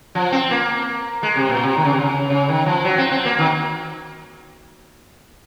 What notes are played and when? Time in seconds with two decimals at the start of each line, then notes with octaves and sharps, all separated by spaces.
0.15 F3
0.32 C4
0.51 A#3
1.23 G#3
1.36 C3
1.49 A#2
1.63 C3
1.77 D#3
1.85 C#3
1.93 C3
2.00 C#3
2.30 C#3
2.49 D#3
2.66 F3
2.84 F#3
2.98 C4
3.11 C4
3.25 A#3
3.39 D#3